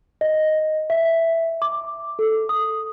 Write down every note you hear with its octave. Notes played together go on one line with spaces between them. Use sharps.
D#5
E5
D6
A4
D#6